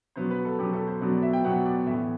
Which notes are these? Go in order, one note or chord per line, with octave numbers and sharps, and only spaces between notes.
B2 F#3 B3 C5
B4
A4
B2 F#3 B3 G4
A4
C5
B2 F#3 B3 D5
D5
E5
G5
B2 F#3 B3 F#5
D5
A2 E3 B3 E5